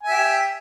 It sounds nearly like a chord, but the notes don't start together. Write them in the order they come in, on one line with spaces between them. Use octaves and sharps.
G#5 E5 G4